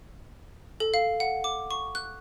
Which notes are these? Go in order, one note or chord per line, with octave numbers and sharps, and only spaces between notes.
A4
F5
F#5
D6
C#6
F#6